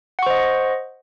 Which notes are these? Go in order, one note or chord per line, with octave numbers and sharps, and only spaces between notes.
C5 D#5 F#5 C#6